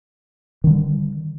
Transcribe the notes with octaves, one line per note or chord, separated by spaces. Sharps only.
D3 D#3 G3